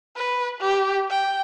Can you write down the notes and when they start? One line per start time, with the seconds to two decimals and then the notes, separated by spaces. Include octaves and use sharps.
0.16 B4
0.60 G4
1.10 G5